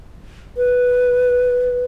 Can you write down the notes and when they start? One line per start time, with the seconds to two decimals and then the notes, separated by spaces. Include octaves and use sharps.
0.57 B4